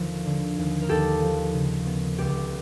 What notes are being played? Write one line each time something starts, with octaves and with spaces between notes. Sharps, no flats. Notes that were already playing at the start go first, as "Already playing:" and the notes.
Already playing: D#2 D3 F3 A4
D3
D#2
A#4
D#2 G4 A4
F3
C#3
B3
C#2 G4